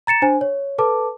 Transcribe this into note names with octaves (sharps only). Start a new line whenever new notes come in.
A#5 A6 C#7 E7
D4 C5 G#5
C#5
A4 B4 A5 D6